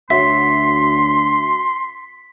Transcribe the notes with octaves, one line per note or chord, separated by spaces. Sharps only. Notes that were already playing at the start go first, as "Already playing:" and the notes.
D2 F#4 C#5 E5 C6 B6